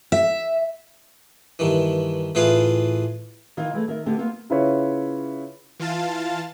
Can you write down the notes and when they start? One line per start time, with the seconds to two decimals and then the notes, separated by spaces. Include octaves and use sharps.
0.12 E5
1.59 G2 D#3 E3
2.35 A2 E3 F4 G#4 B4 F5
3.57 D#3 E3 F4
3.73 E3 G#3 A3
3.88 D#3 A#4 E5
4.06 D3 A3 B3 G4
4.19 A#3 B3 F4
4.50 C#3 E4 F4 B4 C#5
5.80 E3 F4 F5 A5 A6